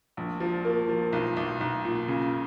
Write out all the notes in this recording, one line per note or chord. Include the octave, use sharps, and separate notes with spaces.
A#1
F3
A#3
F3
B1
B1
B1
A#2
C#3